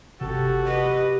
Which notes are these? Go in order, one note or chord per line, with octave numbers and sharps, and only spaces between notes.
G1 C3 F#4 G4 A4
G4 B4 D#5